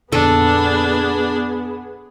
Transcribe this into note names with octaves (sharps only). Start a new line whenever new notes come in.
F2 A#2 D3 B3 D4 G#4 A4